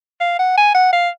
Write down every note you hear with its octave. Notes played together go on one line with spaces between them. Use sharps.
F5
F#5
G#5
F#5
F5